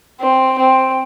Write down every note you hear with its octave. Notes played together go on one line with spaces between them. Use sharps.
C4
C4